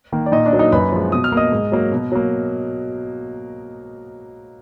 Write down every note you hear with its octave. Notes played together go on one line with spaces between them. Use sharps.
D#3 A#3
D5
A#2 D#4 D#5
D4 D5
F#3 A#3
D#4 D#5
F#2 B4 B5
F3 G#3
B2 D#6
F6
A#3 D#5 D#6
G#2
F#3 A#3
B2
F#3 A#3